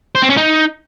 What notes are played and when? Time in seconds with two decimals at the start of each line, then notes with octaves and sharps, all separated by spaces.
0.15 C5
0.22 C4
0.30 C#4
0.37 D#4